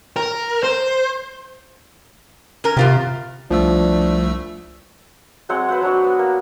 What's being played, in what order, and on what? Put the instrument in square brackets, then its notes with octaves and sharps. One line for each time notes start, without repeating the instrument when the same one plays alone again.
[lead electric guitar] A#4
C5
[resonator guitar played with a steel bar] C#4 A#4
[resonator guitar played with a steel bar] E2 F4 G4 [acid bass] C3
[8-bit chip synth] C2 A3 E6 [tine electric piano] F3 [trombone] D4
[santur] F#3 G#3 C4 F#5
B4 C5 F#5
F#3 D4 F#4
B3
A#3